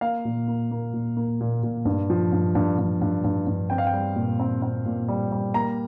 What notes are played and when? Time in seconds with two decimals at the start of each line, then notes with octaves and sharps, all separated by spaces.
0.01 A#3 F5
0.25 A#2
0.48 A#3
0.71 A#3
0.93 A#2
1.17 A#3
1.41 A#2
1.63 A#2
1.85 G2
2.10 F3
2.32 G2
2.55 G2
2.79 G2
3.02 G2
3.24 G2
3.47 G2
3.70 C4 G5
3.78 F5
3.87 G5
3.93 G3
4.16 A#2
4.40 C4
4.62 C4
4.86 A#2
5.08 G3
5.32 G3
5.54 A#3 A#5